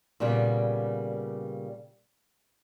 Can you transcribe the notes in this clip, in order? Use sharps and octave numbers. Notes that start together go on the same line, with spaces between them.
A#2 C#3 G3 A#3 B3